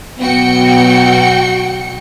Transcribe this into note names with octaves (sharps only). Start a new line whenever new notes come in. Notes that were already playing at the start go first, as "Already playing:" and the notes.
B2 F#3 B3 F#4 G5 C#7